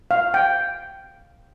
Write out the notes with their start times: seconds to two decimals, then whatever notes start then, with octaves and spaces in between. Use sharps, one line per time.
0.11 F5
0.34 G5